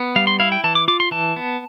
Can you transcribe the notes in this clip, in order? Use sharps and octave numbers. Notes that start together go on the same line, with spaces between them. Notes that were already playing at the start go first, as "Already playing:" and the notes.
Already playing: B3
G3 F5
C6
E4 F5
G5
E3 A5
D6
F4 D6
C6
E3 A5
B3